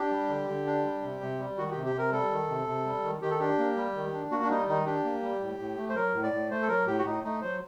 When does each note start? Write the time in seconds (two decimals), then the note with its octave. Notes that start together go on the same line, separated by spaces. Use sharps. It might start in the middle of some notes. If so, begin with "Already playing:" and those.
Already playing: D4 G4
0.11 G3
0.29 D3
0.48 D3
0.66 D4
0.85 G3
1.03 C3
1.21 C3
1.39 G3
1.57 D#3 F#4
1.71 C3 G4
1.85 G4
1.94 C3 A#4
2.12 G3 A4
2.31 D#3
2.49 C3
2.67 C3
2.86 G3
3.04 D#3
3.21 D#3 G4
3.31 A4
3.39 D4 G4
3.58 A#3
3.77 G3
3.95 D#3
4.13 D4
4.31 A#3 F#4
4.43 D4
4.50 G3 D#4
4.68 D#3 D#4
4.86 D4 G4
5.04 A#3
5.23 G3
5.41 A2
5.59 A2
5.77 A3
5.89 C5
5.96 F#3 A#4
6.14 A2
6.23 D5
6.33 A2
6.50 A3 C5
6.62 A4
6.68 F#3 A#4
6.87 A2 G4
6.98 F#4
7.05 A2 D#4
7.23 A3 D#4
7.42 F#3 C5